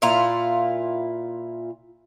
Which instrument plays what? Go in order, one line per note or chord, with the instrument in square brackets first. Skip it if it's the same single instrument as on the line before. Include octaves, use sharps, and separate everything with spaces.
[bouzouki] A#2 E4 F4 A#5